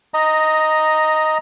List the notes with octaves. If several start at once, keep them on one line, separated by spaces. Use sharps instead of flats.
D#5 A#5